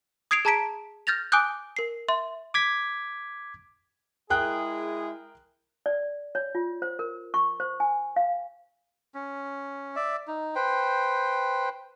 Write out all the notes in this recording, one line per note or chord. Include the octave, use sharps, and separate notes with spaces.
D#6 G#6 C7 D7 F7
G#4 A5 A#5 G#6 B6 D7
F6 G6 A6 A#6 F7
G#5 D6 D#6 F#6 G6
A#4 C7
E5 C6
D6 G#6 B6
G#3 E4 G#4 A#4 G5 F#6
D5
C#5
F4
C5
A#4
C#6
C5
G#5
F5
C#4
D5 E5
D#4
B4 C5 G5